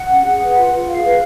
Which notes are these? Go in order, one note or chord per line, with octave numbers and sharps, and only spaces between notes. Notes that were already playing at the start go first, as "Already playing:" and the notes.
Already playing: F#5
C#4
G#4
B4
F4
F4
G#4 F5
B4